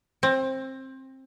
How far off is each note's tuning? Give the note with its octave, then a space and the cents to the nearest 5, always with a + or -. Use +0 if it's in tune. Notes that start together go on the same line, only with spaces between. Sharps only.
C4 +20